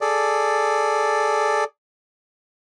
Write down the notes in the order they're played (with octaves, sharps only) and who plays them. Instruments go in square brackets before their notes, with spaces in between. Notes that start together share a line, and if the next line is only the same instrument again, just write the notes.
[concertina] G#4 A4 D5